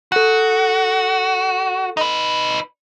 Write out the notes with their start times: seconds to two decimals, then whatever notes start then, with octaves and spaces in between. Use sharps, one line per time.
0.12 F#4 A4 F#6
1.97 D#4 B4